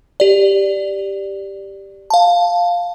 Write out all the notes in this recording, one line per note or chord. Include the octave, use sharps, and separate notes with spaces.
G4 D5
F5 A5